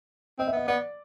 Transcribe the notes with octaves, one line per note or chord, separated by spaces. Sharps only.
C4 D#5
E5
B3 D#5
B3 D5